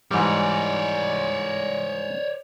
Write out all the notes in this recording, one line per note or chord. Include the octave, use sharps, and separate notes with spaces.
G#2 E3 G3 C#5 D5